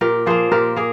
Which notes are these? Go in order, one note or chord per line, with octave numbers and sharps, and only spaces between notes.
A#2 G4 A#4
F3 A#3 G#4 C5
A#2 G4 A#4
A#3 G#4